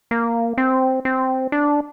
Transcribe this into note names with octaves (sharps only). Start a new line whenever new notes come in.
A#3
C4
C4
D4